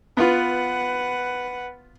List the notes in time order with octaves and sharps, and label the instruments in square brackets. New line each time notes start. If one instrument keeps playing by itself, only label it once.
[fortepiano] B3 F4 [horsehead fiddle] B4 F#5